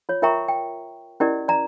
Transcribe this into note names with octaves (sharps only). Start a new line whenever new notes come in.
F4 C#5
F4 A#4 E5 G5 A#5 C#6
G5
C#4 E4 G4 A#4 D5 D#5
D5 A#5